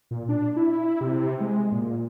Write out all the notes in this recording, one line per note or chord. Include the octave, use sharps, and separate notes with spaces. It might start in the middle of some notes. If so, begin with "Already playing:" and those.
A#2
D4
E4
C3
G#3
A#2